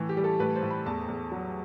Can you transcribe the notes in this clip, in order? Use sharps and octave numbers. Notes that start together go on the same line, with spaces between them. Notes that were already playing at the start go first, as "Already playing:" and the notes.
Already playing: A2 E3
G4
G3
A4
A2 B4
C5
A2
B5
E2 A5
E2
F#3